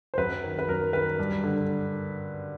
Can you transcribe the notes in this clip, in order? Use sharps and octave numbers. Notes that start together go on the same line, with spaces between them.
C5
F#2 B4
D#3
B4
F#2 A#4
D#3 B4
G2
D3